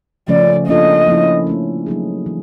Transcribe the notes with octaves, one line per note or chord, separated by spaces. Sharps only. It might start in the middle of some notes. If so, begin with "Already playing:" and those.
C#3 F3 A3 C#4 D5
F3 A#3 D4 F4 A4 D#5
F3 A#3 C#4 E4
F3 A3 C#4
F#3 A#3 D#4 G#4
E3